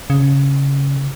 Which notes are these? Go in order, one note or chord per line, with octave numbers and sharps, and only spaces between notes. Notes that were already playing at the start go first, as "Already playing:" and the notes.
C#3